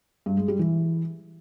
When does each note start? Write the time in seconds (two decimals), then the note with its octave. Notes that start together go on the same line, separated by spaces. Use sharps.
0.26 G2
0.37 G#3
0.48 G3
0.59 E3